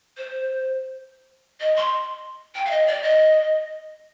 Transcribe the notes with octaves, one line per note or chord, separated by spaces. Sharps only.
C5
D#5
C6
G5
F5
D#5
D5
D#5